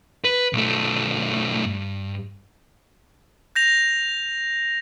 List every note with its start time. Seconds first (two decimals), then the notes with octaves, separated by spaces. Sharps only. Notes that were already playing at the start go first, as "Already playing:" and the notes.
0.24 B4
0.53 B1 A3
1.65 G2
3.56 G6 A#6 F7